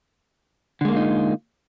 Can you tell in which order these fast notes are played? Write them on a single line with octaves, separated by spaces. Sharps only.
D3 G#3 A#3 F4 D#4